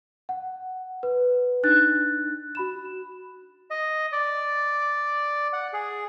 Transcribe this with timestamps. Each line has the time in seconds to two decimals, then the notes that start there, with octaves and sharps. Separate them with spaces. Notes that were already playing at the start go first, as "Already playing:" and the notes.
0.29 F#5
1.03 B4
1.63 D4 D#4 F#6 A6
2.55 F#4 B5 E7
3.71 D#5
4.13 D5
5.53 F#5
5.73 G#4